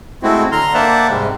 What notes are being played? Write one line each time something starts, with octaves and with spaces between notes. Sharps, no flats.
G#3 A3 C4 E4 F#4
D3 A#5 C6 F6
A#3 C5 D5 E5 F#5 A5
G#2 C3 G3 G#3